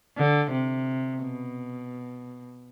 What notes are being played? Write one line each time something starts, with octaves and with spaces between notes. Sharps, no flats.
D3
C3
B2